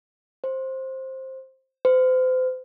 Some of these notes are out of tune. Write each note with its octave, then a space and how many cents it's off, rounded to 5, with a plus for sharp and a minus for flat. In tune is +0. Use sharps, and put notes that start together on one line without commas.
C5 +10
C5 -35